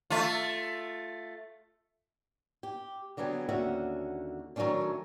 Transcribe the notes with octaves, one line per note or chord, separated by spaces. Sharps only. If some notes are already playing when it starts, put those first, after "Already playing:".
A3 F4
G4
D3 F#3 G3 B3 G#4
D#2 D3 C#4 F#4 E5
D#3 F#3 G#3 A3 C#4 D4